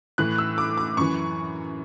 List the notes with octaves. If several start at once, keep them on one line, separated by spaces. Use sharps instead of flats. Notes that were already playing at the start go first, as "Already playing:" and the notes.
A2 E3 F#6
E6
D6
D6
F#2 E3 C#6